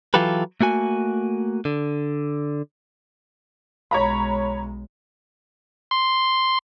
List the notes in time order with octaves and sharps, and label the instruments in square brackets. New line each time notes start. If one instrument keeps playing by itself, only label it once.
[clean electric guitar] E3 F#3 F4 G4 A4 B4
A3 A#3 F#4 G#5
D3
[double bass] B1 G#3 [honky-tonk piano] C#5 A#5 B5
[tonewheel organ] C6